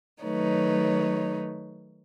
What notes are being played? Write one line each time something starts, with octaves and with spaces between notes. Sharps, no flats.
D#3 F#3 A3 D#4 B4 C#5